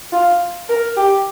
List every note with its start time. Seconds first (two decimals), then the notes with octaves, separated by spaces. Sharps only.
0.12 F4
0.69 A#4
0.96 G4